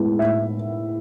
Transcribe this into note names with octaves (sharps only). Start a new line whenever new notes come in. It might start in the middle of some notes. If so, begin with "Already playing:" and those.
Already playing: A2 G#3 B3 E4
A2 E5